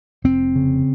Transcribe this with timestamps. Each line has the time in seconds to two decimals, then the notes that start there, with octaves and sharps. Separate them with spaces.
0.24 F1 C4
0.55 C#3